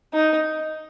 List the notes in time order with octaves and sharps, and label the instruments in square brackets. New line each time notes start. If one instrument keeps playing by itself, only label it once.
[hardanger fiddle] D#4